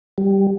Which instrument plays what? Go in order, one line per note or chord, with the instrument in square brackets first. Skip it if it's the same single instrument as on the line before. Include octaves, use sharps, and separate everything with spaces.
[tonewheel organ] G3